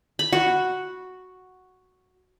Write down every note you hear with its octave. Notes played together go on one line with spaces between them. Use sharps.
B5
F#4